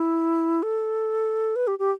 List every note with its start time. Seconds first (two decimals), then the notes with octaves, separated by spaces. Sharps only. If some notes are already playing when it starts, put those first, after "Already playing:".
Already playing: E4
0.63 A4
1.56 B4
1.67 G4
1.79 G4